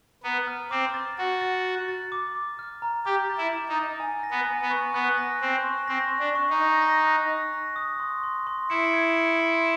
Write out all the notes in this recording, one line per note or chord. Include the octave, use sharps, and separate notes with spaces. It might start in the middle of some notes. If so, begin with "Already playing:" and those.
B3 A#5
F6
C4 D6
A6
F#4 A6
A6
A6
A6
D6
D6
F6
A#5
G4 D6
A6
E4
D6
D#4
A6
G#5
A#6
B3
G#5
B3
C#6
B3 F#6
A#6
C4 F#6
C#6
C4 A#6
C#6
D4
C#6
D#4
A#6
A#6
F#6
F#6
A#6
D#6
C6
C6
C6
E4 C#7
G#6
C#7
C6